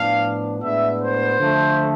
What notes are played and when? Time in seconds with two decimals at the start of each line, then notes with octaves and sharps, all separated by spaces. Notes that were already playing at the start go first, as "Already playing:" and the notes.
Already playing: A2 F3 B3 D4 F5
0.61 A2 G#3 B3 D4 E5
1.00 C5
1.40 D3 F3 A3